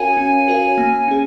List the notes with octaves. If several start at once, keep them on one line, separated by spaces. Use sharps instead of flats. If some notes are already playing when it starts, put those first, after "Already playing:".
Already playing: C#4 F#4 A#4 C#5 F5 G#5
C#4
F#4 A#4 C#5 F5
A#3
C#4 G#4